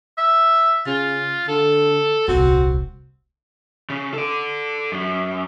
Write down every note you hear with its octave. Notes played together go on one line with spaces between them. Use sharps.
E5
C#3 F4
D3 A4
D#1 C2 C4 F#4
C#3
A4 D5
F#2